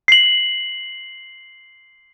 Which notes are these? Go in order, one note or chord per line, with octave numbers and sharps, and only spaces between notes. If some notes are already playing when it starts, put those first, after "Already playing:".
C7 F#7